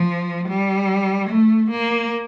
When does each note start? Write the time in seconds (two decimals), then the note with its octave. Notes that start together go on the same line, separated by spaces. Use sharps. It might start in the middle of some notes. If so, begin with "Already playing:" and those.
Already playing: F3
0.49 G3
1.30 A3
1.71 A#3